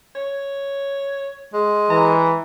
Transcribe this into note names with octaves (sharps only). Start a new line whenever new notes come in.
C#5
G#3
E3 A#5